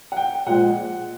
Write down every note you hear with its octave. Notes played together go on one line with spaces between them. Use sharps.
F#5
G5
A#2 F3 G#3 F#5